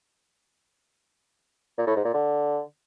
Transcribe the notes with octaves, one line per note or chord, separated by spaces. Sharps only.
A#2
A2
G#2
A#2
D3